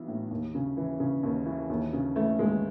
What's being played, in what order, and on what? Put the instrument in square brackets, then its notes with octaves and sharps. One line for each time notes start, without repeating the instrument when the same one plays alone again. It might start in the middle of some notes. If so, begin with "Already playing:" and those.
Already playing: [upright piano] B1 E3
A2
D#2
C#3
E3
C#3
D#2
E3
D#2
C#3
E3 A3
D#2 G#3